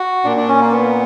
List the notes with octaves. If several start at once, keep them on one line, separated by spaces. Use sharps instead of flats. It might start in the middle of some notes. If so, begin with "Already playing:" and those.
Already playing: F#4
A#2 D4
D4
C#4
A#3
B3